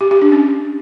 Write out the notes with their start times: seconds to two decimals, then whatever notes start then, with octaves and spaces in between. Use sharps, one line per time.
0.01 G4
0.11 G4
0.22 D4
0.32 C#4